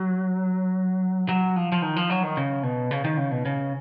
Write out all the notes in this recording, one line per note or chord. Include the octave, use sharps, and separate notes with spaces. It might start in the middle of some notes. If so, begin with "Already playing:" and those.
Already playing: F#3
F#3
F3
F3
D#3
F3
F#3
D#3
C#3
B2
C#3
D#3
C#3
B2
C#3